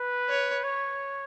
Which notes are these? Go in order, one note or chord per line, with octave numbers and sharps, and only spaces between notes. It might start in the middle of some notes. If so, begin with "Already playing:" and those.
Already playing: B4
C#5
C#5